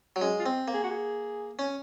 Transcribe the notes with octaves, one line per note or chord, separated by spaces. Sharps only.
F#3
G#3 C#4
F4
C4
A#3
G#4
F#4
G#4
C#4